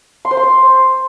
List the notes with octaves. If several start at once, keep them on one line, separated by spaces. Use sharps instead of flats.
C6
C5
C6
C5